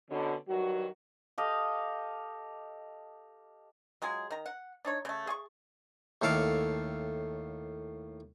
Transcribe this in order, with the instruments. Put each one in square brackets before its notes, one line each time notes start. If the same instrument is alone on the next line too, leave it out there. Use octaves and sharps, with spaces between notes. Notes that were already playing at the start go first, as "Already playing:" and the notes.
[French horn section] B2 D3 C#4
G2 D#3 F#3 F#4
[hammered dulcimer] G4 A4 D#5 F5
[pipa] F#3 G#3 F4 G#4
D#3 A#5
F#5
D4 D#4 C#5
C#3 A3
G#4 C#6
[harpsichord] D#2 A2 A4 F5 D6